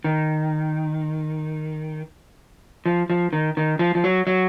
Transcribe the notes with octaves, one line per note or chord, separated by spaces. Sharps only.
D#3
F3
F3
D#3
D#3
F3
F3
F#3
F#3